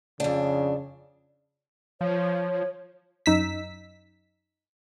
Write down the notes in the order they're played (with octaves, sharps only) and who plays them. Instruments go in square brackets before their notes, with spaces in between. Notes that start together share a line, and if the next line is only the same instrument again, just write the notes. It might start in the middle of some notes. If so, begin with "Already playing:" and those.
[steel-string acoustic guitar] F2 D4 [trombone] C#3
[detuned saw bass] F3 [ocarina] C#5
[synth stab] F#2 D#4 E6 B6